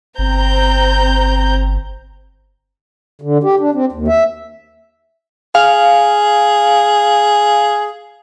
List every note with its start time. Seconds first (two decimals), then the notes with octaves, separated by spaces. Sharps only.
0.18 G1 C4 A#5 G6
3.22 D3
3.44 G4
3.60 D4
3.74 C4
3.92 D#2
4.08 E5
5.55 G#4 F5